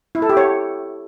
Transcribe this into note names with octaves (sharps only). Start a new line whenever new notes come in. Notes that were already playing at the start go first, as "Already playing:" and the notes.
E4
A4
G4
C#5